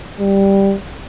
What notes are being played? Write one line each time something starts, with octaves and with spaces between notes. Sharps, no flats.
G3